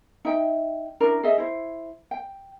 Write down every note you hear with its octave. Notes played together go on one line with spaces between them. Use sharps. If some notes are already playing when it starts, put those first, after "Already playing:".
D#4 E5 G5
C#4 D4 E4 A#4
G#4 A4 D#5 E5
E4 C5
G5